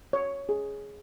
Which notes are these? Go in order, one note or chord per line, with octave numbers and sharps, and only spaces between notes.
C#5
G#4